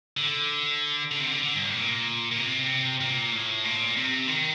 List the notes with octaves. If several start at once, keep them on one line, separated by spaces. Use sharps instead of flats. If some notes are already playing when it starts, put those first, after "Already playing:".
D3
D3
C3
D3
D3
G2
A2
A#2
A#2
C3
A#2
A2
A#2
C3
D#3